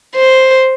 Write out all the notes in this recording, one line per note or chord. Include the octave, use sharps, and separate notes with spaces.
C5